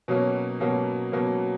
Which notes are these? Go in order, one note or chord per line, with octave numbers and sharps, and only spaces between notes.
B2 F#3 A#3 C#4
B2 F#3 A#3 C#4
B2 F#3 A#3 C#4